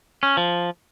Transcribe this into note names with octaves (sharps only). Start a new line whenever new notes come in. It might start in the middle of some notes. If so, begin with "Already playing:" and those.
C#4
F3